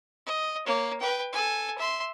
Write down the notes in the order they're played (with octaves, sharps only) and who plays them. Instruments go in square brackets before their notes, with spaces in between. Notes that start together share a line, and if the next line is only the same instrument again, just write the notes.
[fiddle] D#5
A#3 C#5
B4 G5
A4 G#5
E5 C6